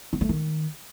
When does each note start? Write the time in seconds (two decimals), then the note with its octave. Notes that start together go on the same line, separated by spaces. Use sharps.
0.13 B3
0.21 A3
0.29 D#3